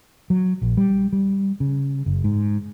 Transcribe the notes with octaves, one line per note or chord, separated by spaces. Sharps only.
F#3
A#1
G3
G3
C#3
F#1
G#2